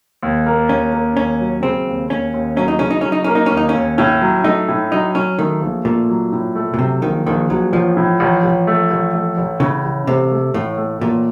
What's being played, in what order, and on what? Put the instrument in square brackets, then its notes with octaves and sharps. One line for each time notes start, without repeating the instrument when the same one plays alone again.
[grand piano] D#2
A#3
[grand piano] D#2 [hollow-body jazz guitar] C#4
[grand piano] A#3
[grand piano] D#2 [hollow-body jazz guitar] C#4
[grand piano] F#3
[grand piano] C#3 [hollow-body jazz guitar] C4
[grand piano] D#2
[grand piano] D#2 [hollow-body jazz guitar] C#4
[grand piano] D#2
[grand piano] F#3 [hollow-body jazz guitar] C#4
[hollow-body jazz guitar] D#4
[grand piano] C#3 [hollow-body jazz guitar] C#4
[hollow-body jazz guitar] D#4
[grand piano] F#3 [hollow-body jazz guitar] C#4
[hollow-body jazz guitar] D#4
[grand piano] A#3 [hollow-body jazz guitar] C#4
[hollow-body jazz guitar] D#4
[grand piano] D#2 [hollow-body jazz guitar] C#4
[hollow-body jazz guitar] D#4
C#4
[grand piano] D#2
[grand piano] A2 [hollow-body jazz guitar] C#4
[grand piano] F#3
[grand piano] A3 [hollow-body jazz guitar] D#4
[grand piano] A2
[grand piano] F#3 [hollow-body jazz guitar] D#4
[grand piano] F#3 [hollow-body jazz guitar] C#4
[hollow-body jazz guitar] D#3 [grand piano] A3
[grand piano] A#1
[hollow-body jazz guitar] A#2 [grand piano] A3
[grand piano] F#3
A2
A3
[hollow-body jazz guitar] A#2
[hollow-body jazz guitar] C3 [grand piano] F#3
[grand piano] A#1 [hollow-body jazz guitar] D#3
[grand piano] A#1 [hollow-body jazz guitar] D#3
[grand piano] A#1 [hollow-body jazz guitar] F#3
[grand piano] A1 [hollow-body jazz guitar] F3
[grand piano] A2
A1
A1
A3
A1
A3
A1
[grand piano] A2 [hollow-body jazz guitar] C#3
[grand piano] A1
[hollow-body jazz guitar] C3 [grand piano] A3
[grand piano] A3
[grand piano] A1 [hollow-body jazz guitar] A2
[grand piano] A3
[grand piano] A1 [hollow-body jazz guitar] A#2